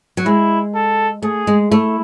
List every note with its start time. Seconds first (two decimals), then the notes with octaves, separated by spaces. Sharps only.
0.17 F#3
0.26 G#3 E4
0.75 A4
1.23 A3 G#4
1.47 G#3
1.71 A3 E4